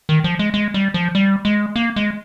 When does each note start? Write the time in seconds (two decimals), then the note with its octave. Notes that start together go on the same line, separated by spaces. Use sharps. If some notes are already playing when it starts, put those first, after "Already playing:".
0.09 D#3
0.24 F3
0.39 G#3
0.54 G#3
0.74 G3
0.94 F3
1.15 G3
1.45 G#3
1.76 A#3
1.96 G#3